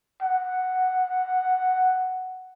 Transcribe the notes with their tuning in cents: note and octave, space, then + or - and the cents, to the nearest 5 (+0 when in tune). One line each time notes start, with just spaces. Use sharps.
F#5 +0